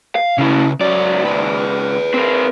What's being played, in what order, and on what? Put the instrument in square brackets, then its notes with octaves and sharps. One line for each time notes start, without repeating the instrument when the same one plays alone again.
[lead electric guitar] F5
[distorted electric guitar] C#3 B4 [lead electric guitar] C#4 E4
[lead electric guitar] C#2 D5 [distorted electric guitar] C#4 F#4
[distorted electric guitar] G#4 B4
[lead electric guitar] C4 A#4